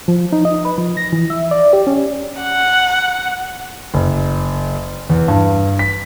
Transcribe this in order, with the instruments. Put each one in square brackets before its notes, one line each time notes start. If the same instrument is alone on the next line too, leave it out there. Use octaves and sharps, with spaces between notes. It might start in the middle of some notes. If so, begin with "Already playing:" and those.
[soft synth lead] F3
D#4
D#5
B4
F3
A#6
E3
E5
D5
G4
C#4
[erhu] F#5
[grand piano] F#1
E2
G2
B6